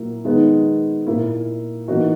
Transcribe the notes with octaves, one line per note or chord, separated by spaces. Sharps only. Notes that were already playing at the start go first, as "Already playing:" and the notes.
Already playing: A#2 F#3 A#3 E4
D#3 G#3 B3 D#4
A#2 A#3 E4
E3 A#3 D#4 F#4